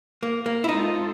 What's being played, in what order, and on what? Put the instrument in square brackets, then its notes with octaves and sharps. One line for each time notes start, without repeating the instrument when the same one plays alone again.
[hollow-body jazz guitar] A#3
A#3
E4
[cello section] G#3 C4 F4 A4 [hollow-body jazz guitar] D#4